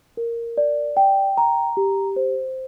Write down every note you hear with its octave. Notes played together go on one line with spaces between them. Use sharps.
A#4
D5
G5
A#5
G4
C5